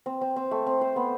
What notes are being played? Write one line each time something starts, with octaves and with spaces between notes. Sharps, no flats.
C4
C4
C4
A3
C4
C5
B3